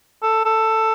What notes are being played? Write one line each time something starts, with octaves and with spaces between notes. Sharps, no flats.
A4
A4